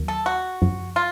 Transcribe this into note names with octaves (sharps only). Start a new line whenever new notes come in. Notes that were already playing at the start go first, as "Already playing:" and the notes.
Already playing: D#2 D#3 F#3 A#3
A4
F#4
F#2 C#3 F3
F4